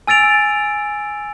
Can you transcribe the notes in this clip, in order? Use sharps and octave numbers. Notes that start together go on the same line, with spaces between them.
G#5 E6 A6 D7 F7